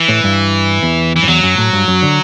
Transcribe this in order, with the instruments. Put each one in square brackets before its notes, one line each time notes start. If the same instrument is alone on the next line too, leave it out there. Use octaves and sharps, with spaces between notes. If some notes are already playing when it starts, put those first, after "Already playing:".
Already playing: [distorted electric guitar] E3
[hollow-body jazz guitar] A2
G2
E2
[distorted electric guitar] E3
[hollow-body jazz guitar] F#2
[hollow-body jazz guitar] E2 [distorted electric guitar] F#3
[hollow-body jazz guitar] F#2
A2
G2
F#2
D3